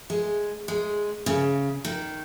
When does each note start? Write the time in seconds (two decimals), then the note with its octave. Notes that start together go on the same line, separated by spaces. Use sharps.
0.10 G#3
0.68 G#3
1.26 C#3
1.85 D#3